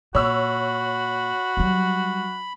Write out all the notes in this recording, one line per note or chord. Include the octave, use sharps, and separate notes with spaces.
A#2 F#4 C#5 B5 E6
F#3 G3